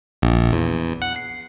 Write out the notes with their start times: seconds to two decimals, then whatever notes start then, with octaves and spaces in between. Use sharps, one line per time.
0.22 A#1
0.52 E2
1.02 F#5
1.16 C7